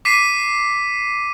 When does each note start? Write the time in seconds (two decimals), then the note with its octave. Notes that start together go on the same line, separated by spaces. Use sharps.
0.05 D6 B6 C7 D#7